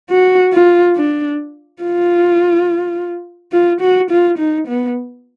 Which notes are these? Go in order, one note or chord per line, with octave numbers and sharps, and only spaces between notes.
F#4
F4
D4
F4
F4
F#4
F4
D#4
B3